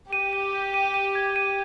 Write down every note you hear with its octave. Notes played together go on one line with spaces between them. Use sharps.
G4 D#7
D#7
D#7
D#7
D#7
G#6
D#7